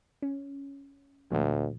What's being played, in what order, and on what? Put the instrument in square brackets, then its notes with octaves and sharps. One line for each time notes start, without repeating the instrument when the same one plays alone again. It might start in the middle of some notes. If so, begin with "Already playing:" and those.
[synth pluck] C#4
[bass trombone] D2 [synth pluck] A#2 F3